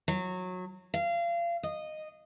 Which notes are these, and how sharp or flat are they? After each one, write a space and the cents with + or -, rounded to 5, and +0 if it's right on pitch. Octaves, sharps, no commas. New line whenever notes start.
F#3 -20
F5 -30
D#5 -10